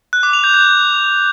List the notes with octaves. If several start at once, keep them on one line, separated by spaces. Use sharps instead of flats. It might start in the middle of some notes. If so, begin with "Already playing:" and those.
F#6
D6
F7
G6
G6